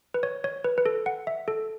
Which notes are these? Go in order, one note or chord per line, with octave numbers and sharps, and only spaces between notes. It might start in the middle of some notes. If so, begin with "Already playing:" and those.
B4
C#5
C#5
B4
B4
A4
F#5
E5
A4